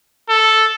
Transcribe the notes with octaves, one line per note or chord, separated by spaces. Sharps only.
A4